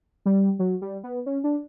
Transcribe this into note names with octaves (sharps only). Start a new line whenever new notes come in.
G3
F#3
G3
B3
C#4
D4